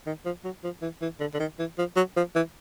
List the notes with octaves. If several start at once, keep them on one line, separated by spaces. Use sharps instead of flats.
D#3
F3
F#3
F3
E3
E3
D3
D3
D#3
E3
F3
F#3
F3
E3